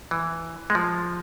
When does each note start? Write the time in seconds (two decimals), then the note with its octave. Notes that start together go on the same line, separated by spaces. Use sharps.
0.11 E3
0.70 G#3
0.75 F3